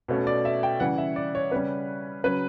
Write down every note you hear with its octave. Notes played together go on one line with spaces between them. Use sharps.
B2 A3 C#4
D5
E5
G5
C#3 E3 G3 F#5
E5
D5
C#5
C#3 G3 C#4 B4
C#3 F#3 C#4 B4